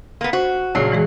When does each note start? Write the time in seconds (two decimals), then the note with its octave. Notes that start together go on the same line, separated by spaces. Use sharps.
0.21 A#3 B3
0.33 F#4 C5
0.75 A#1 C#3 F#3 C7
0.92 E3 G#3 G#4